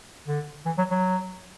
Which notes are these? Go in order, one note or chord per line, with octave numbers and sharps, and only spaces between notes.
D3
E3
F#3
F#3